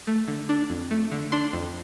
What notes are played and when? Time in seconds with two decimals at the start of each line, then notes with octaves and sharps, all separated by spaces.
0.07 A3
0.28 D3
0.49 D4
0.70 F2
0.91 A3
1.12 D3
1.32 D4 C6
1.53 F2